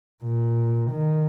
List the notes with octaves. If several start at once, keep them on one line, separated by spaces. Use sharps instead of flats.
A#2
D#3